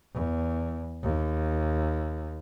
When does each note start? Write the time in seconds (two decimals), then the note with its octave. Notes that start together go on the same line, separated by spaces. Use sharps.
0.13 E2
1.03 D#2